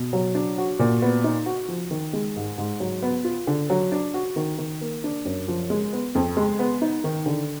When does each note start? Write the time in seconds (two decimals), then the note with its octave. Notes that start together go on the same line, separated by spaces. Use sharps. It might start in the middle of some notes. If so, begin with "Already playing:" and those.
Already playing: B2
0.13 F#3
0.35 D4
0.58 F#4
0.79 A#2
1.02 B3
1.24 D#4
1.46 F#4
1.69 F3
1.91 D#3
2.13 G#3
2.36 G#2
2.58 G#2
2.80 F#3
3.03 B3
3.24 F4
3.47 D3
3.70 F#3
3.92 D4
4.14 F#4
4.36 D#3
4.58 D#3
4.81 A#3
5.04 D4
5.25 F#2
5.48 F3
5.70 G#3
5.93 B3
6.15 F2
6.37 G#3
6.59 B3
6.82 D#4
7.04 D#3
7.26 D3